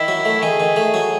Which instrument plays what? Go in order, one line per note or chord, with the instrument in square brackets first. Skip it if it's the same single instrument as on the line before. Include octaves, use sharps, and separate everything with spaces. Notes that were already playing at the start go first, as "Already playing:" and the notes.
Already playing: [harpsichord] D#3 [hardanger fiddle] E4
[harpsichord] F#3
A3
[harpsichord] D#3 [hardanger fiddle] G#4
[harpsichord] D#3
A3
F#3